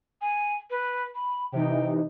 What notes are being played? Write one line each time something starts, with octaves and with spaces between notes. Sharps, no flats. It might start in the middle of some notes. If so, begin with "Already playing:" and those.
G#5
B4
B5
C3 E3 D#4 G5